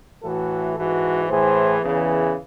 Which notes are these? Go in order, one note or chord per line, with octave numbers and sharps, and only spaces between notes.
A2 E3 F#4 A4
G#2 E3 F#4 A4
A2 E3 G#4 C5
E2 C#3 E3